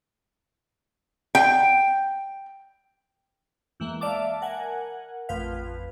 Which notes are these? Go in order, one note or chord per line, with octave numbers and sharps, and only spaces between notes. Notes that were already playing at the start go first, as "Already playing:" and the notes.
G5
E2 E3 G#3 A#3
D5 E5 F5 A5 D6
A#4 F#5 G#5
A1 F2 F4 B4 F5